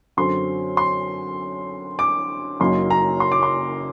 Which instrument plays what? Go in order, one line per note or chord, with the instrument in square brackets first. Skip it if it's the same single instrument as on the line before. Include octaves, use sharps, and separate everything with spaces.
[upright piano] F#2 D3 F#3 C4 C6
C6
D6
F#1 F#2 F#3 A#3 D#4 C6
A#5
C6
D6
C6